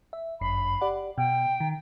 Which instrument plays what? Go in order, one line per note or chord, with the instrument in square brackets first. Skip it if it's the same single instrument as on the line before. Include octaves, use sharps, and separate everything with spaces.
[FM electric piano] E5
[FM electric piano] G1 F#2 C7 [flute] B5
[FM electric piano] G4 D5 F#5
[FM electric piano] B2 [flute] G5
[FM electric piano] D#3